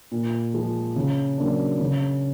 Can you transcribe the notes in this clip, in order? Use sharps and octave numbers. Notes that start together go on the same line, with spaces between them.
A#2
F3 G#3
C#3
F#3 A#3 D4
C#3